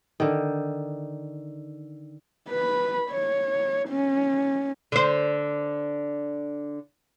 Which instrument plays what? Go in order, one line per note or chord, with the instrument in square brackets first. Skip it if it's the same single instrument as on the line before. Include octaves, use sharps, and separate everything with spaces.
[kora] D3 D#3
[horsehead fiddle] B4 B5
C#5
C#4
[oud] D3 C5